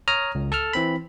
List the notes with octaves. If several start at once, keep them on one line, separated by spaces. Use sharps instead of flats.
C#5 A#5 D#6 F6
C#2
A4 A5 F6
E3 C4 B5